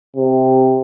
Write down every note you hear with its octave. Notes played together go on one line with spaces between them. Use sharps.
C3